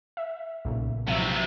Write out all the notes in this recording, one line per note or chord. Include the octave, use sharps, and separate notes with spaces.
E5
B1 A#2 C#3
C3 F3 F#3 E5 E6